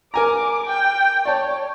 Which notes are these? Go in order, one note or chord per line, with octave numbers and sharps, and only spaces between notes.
A#4 G#5 A#5 D6
G5
C#5 D5 A5